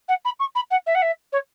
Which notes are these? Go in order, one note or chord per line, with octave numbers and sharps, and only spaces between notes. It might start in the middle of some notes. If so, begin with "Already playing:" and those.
F#5
B5
C#6
B5
F#5
E5
F#5
E5
C#5